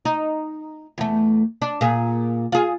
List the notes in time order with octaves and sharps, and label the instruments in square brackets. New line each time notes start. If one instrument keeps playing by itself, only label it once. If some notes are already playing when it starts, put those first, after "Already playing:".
[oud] D#4
E2 A3
D4
A#2 G#4
F4 G#4